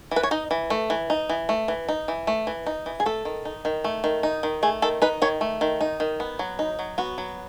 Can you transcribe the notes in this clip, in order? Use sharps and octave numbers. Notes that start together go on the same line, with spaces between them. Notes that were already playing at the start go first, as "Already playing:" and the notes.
E3 B4
C#5
D#4 D#5
E3
A3
E3
D#4
E3
A3
E3
D#4
E3
A3
E3
D#4
E3
G#4
A3 A4
D#3
D#4
D#3
A3
D#3
D#4
D#3
A3 G#4
D#3 A4
D#4 B4
D#3 C#5
A3
D#3
D#4
D#3
B3
F#3
D#4
F#3
B3 F#4
F#3